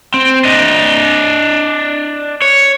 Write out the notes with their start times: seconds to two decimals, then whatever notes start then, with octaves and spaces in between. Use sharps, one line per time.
0.14 C4
0.45 D4 D#5
2.42 C#5